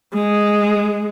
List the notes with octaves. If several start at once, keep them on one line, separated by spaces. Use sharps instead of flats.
G#3